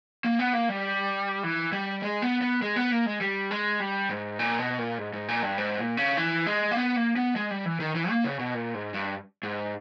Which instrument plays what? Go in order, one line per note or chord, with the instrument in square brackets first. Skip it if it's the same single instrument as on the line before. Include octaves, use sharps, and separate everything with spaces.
[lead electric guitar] A#3
B3
A#3
G3
E3
G3
G#3
B3
B3
G#3
B3
A#3
G#3
G3
G#3
G3
G#2
A#2
B2
A#2
G#2
G#2
A#2
G2
G#2
A#2
C#3
E3
G#3
A#3
B3
A#3
B3
G#3
G3
E3
D#3
E3
A#3
C#3
B2
A#2
G#2
G2
G#2